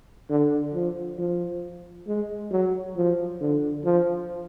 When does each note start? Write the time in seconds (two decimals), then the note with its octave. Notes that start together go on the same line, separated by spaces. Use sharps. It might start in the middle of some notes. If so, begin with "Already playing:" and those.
0.30 D3
0.74 F3
1.18 F3
2.07 G#3
2.52 F#3
2.96 F3
3.40 D3
3.84 F3